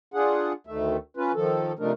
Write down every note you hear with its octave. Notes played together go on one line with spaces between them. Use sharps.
D4 F4 G#4 F#5
D2 D#3 A3 E5
C#4 F4 B4
D#3 F3 A4
C3 F3 A3 D4 D#4 A#4